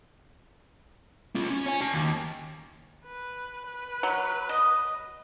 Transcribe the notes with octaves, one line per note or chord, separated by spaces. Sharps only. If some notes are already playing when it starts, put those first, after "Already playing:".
C#4 F4
C#4
C#5 G#5
F#4 A5
D#2
B4
B4
F#3
D#5